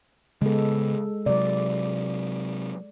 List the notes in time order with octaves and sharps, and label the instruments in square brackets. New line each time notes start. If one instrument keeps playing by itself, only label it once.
[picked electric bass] C#3 B3 [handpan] G#3 A4
[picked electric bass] C3 F#3 [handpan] D5